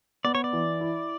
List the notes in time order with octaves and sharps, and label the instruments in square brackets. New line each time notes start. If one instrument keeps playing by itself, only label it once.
[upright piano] B3 [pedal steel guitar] D5
[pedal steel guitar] C#5
D5
[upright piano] E3
E4